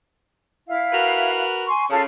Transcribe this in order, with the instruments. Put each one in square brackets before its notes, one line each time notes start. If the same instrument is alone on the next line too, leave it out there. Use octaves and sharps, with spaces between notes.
[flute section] E4 F5
[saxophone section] F#4 A#4 B4
[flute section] G#5 C6 C#6
[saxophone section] C#3 [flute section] F4 A4